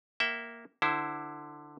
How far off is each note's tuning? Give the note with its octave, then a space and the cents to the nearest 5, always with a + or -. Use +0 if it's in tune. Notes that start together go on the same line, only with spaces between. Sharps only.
A#3 +0 E5 +0 G5 -40
D3 +15 E4 +0 C5 +0